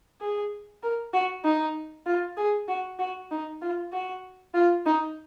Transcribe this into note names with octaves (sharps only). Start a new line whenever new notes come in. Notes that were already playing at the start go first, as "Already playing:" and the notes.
G#4
A#4
F#4
D#4
F4
G#4
F#4
F#4
D#4
F4
F#4
F4
D#4